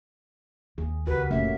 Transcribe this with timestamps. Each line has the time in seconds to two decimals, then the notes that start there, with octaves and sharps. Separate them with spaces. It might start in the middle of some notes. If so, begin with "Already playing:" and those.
0.78 D#2 A#3 G#4
1.07 C#2 F#4 G4 A#4 B4
1.31 F1 A#1 A3 A#3 C#4 E5